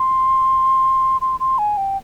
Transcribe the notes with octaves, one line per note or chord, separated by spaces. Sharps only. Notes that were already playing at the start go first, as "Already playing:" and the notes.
Already playing: C6
C6
C6
G#5
G5